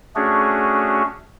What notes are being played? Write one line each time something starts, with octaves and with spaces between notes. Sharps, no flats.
A3 C#4 D4 F#4 G#4